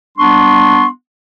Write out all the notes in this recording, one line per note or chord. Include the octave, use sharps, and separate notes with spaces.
G3 B3 D4 C6 C#6